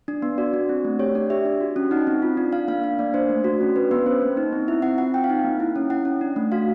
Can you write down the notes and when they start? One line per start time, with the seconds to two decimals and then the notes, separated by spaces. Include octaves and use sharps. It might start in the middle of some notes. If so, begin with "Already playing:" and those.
0.08 D4
0.22 B3
0.38 F#4 D5
0.53 D4
0.69 C4
0.85 A3
0.99 G4 C#5
1.15 D4 D5
1.30 G4 E5
1.45 D4
1.61 F#4
1.76 C#4
1.91 D#4 F#5
2.07 C4
2.22 F4
2.37 D4
2.53 D4 F5
2.68 A#3 F5
2.84 D4 F5
2.99 A#3 D5
3.14 D4 C5
3.29 A3
3.44 F#4
3.61 C#4
3.76 D4 B4
3.91 B3 B4
4.06 C#4 C5
4.22 A#3
4.37 D#4
4.53 C4
4.68 E4 E5
4.82 C4 F#5
4.98 F4 F#5
5.14 C4 G5
5.24 F5
5.29 D#4 F#5
5.44 A#3
5.60 E4
5.76 C#4
5.90 E4 F#5
6.05 C#4
6.21 D4
6.36 A3
6.52 F#4 F5